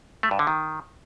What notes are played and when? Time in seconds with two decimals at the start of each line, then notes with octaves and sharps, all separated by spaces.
0.23 A3
0.31 G2
0.39 D3
0.47 D#3